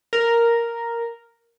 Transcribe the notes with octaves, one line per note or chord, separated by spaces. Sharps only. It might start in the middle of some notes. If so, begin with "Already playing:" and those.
A#4